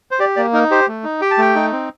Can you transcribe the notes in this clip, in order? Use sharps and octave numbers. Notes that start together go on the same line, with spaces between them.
C5
G4 D5
A#3 D5
D#4 A#4
G4 C5
A3
D#4
G4 G5
A5
A3 G5
D#4
C4